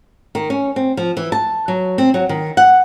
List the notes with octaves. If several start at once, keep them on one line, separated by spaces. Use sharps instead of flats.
D#3
C#4
C4
F3
E3
A5
F#3
C4
F#3
D#3
F#5